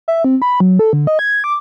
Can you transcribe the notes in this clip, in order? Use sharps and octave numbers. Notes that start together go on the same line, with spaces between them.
E5
C4
B5
F#3
A4
D3
D#5
G#6
D6